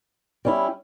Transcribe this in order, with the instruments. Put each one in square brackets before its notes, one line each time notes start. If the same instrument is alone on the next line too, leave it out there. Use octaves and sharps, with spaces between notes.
[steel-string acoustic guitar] G3 C#4 E4